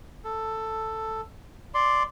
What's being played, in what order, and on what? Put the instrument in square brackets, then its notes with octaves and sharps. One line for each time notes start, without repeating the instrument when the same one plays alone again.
[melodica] A4
D5 C6